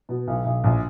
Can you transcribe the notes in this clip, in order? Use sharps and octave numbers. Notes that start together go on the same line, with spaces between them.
B2
B1
B1
A#1